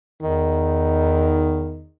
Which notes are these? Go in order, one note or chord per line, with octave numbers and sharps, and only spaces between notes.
E2 D#3 D#4